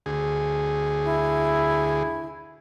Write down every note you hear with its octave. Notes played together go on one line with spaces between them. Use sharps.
D2 G#4
E4